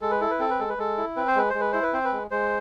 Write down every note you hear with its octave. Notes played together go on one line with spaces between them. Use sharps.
G#3 A4
B4
E4 A4
B4
C4 A4
B4
G#3 A4
B4
G#3 A4
E4
C4 B4
C5
G#3 B4
C5
G#3
B4
E4 C5
B4
C4 C5
B4
G#3
G#3 C5